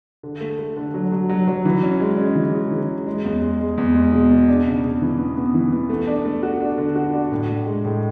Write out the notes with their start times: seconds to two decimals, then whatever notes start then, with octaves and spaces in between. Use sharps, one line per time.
0.23 D3
0.41 A3
0.59 A3
0.77 D3
0.94 F#3
1.12 F#3
1.29 F#3
1.48 F#3
1.65 E3
1.83 C#4
2.00 G#3
2.18 C#4
2.35 E3
2.54 G#3
2.71 E3
2.89 G#3
3.07 G#3
3.24 E2
3.42 G#3
3.60 G#3
3.78 E2
3.95 G#3
4.12 B2
4.30 B2
4.48 D4
4.66 C#3
4.83 C#3
5.01 E3
5.18 B3
5.36 B3
5.54 E3
5.72 B3
5.90 A3
6.07 D4
6.25 A3
6.43 F#4
6.60 D4
6.78 D3
6.95 F#4
7.13 D4
7.32 A2
7.49 A2
7.66 G#3
7.85 A2